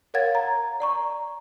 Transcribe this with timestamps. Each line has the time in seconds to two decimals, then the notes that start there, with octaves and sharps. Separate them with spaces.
0.14 A#4 C#5 F5 F#5 G#6 A6
0.35 A#5
0.80 D5 A#5 C#6